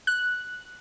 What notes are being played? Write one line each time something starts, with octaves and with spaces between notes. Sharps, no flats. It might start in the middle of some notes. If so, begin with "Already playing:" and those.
F#6